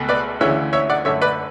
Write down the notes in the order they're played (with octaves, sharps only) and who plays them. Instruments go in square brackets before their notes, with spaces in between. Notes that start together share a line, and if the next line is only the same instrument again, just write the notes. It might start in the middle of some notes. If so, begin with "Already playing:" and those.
Already playing: [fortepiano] C#2 B2 A3
B4 D5
D2 C#3 E3 C#5 E5
C#5 E5
D5 F#5
F#2 D3 A3 C#5 E5
B4 D5